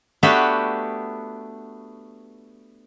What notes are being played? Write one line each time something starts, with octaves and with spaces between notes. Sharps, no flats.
A3 B3 D4 F#4 G4 B4